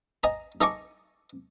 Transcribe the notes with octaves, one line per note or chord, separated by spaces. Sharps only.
D#5 G#5 A#5
D#4 A4 D#5 G#5 C#6 D6